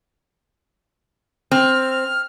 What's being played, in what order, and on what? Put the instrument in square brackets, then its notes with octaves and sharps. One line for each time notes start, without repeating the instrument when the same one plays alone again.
[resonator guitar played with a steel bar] C4 [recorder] F6